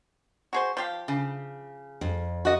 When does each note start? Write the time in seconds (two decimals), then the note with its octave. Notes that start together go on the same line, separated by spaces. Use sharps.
0.53 F#4 G#4 C5
0.77 F3 G4 F5
1.08 C#3
2.01 F2
2.45 F#4 D#5